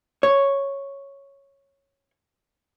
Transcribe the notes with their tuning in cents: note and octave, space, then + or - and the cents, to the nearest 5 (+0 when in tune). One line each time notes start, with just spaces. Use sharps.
C#5 -5